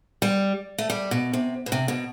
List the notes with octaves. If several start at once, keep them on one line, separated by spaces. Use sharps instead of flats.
G3
A3
G3
B2
C3
B2
C3
B2